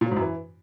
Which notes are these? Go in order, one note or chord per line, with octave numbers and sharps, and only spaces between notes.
A#2
F#3
G#2
F#2
E3